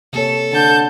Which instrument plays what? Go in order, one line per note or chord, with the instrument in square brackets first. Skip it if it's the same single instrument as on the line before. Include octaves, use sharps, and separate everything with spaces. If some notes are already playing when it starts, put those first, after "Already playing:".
[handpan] C3 A#3 C#5 [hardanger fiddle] A4
[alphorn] D3 [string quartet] A5 G6